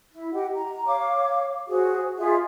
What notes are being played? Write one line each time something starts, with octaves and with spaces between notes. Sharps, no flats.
E4
G4 D#5 F#5
A#5
C#5 F5 D6
F#4 G#4 C5
F4 G#4 D#5 E5